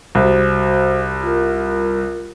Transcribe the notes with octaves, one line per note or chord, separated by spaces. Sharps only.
C2 F#4 C5
F4 A#4